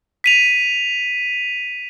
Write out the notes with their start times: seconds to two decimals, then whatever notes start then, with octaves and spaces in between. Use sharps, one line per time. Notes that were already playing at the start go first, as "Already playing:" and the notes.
0.24 B6 D#7 F7